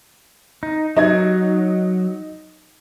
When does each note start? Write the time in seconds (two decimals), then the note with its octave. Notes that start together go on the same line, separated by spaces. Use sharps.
0.63 D#4
0.97 F#3 D#4 D#5 G#6